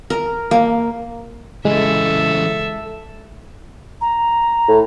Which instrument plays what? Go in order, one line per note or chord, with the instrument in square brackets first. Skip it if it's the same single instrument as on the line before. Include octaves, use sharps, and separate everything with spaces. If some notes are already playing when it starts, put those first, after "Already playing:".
[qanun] A#4
A#3
[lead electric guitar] C#3 E3 [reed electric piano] G#3 [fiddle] A4 E5
[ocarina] A#5
[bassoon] A2